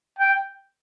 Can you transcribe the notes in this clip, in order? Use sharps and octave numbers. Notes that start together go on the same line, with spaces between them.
G5